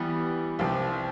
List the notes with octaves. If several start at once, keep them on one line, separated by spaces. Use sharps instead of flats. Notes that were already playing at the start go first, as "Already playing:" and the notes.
Already playing: E3 G3 B3
C2 C3 F3